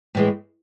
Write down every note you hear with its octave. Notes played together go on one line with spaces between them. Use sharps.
A2 E3 G#3